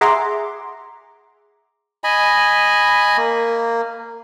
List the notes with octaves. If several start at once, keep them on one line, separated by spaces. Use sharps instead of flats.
G#4 E5 F#5 A#5 C6 D6
D#5 G#5 B5
A#3